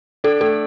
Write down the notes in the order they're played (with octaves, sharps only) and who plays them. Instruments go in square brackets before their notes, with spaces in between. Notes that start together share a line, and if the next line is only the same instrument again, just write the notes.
[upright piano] D4 [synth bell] A4
[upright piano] A3 [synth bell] A4